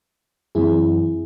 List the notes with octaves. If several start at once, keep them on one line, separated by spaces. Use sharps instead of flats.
F#2 E3 C4 E4 G#4